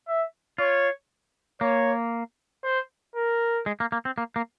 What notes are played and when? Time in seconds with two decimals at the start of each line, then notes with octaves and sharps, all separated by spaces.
0.08 E5
0.58 F4 C#5
1.61 A#3 C#5
2.64 C5
3.16 A#4
3.66 G#3
3.80 A#3
3.92 A#3
4.05 C4
4.18 A#3
4.36 A#3